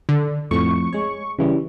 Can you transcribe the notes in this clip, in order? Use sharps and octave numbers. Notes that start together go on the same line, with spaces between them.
D3
F2 A2 C#6
G#3 C#5
C#3 E3 G3